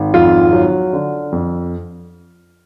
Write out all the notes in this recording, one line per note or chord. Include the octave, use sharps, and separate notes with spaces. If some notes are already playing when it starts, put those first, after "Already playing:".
Already playing: G#1
F2 F4
F#3
D3
F2